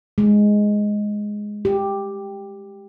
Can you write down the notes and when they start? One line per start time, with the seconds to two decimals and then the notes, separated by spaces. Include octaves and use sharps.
0.18 G#3
1.65 G4